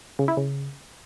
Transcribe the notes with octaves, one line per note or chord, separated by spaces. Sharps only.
C#3
E4
C#3